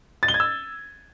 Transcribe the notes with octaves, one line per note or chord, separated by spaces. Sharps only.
A6
G7
G#6
E6